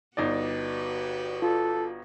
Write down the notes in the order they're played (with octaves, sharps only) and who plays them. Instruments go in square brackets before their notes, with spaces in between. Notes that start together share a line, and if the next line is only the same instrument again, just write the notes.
[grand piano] G1 D#4 D5 [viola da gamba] F#4 G4 B4
[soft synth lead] F4 [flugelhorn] A4